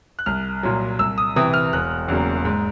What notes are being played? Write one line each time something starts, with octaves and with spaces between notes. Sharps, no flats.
F#6
C2 F6
A#2 F#3
C2 E6
D#6
C3 E3 D#6
F6
E1 F#6
E2 C#3 F#3 A#3
G#2